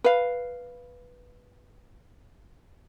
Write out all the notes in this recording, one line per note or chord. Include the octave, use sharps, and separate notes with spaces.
B4 F5